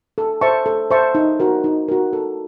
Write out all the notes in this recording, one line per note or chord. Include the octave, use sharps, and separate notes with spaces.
A4
C5 E5 A5 C#6
A4
C5 E5 A5 C#6
D#4
F#4 A#4
D#4
F#4 A#4
A4